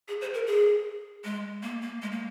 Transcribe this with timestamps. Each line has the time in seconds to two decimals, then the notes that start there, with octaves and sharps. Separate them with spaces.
0.08 G#4
0.21 C5
0.34 A#4
0.47 G#4
1.24 G#3
1.63 A#3
1.82 A#3
2.02 G#3
2.12 A#3